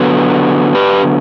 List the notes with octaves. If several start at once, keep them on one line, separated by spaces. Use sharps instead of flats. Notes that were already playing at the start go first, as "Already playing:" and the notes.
Already playing: D3 F#3 B3
G4 B4